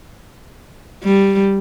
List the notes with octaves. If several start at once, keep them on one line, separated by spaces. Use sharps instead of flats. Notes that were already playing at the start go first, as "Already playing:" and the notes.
G3